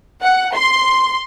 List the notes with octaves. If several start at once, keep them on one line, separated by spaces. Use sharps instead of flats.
F#5
C6